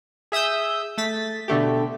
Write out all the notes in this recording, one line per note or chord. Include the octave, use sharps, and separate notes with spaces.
G#4 E5 D#6 E6 G6
A3 A6 B6
B2 D3 A3 G4